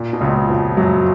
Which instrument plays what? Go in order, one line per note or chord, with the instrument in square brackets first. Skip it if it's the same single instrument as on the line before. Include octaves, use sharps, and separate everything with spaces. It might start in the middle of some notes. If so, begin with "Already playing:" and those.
Already playing: [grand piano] A#2
B2
C#2 C#3
F2 F3
F#2 F#3